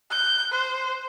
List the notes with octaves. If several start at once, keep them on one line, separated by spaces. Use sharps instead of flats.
F#6 G6
C5